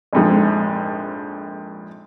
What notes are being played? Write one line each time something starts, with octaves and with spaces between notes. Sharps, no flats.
A#1 F2 G#2